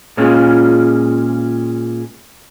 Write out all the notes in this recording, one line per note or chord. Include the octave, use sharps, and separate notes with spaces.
A#2 G#3 C#4 F4 G#4